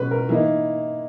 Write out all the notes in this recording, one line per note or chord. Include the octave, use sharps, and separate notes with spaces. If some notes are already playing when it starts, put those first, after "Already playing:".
Already playing: B2 G#3 C#4 B4
A#4
E3 A#3 D#4 E4